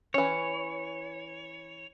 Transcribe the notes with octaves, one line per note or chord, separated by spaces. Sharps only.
E3 C#4 C#5